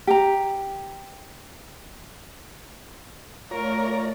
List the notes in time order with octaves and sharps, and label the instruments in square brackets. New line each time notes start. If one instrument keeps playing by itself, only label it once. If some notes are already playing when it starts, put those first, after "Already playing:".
[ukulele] G4 A#5
[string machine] A3 D5 [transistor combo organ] F4 C#5 A#5 [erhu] A#4